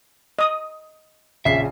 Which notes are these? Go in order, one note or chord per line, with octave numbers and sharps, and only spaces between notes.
D#5 D#6
A#1 C#3 E5 C7